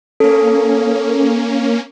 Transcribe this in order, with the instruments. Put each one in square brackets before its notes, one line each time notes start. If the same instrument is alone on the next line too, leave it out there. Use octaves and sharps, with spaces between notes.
[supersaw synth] A#3 C#4 [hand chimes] A4